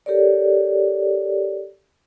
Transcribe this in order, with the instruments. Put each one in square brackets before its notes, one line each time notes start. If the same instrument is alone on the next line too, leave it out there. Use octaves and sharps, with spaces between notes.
[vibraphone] G4 A4 A#4 C#5 D5